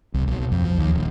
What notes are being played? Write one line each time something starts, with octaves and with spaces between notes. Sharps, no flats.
C2
B1
F2
F3
D#2
D#1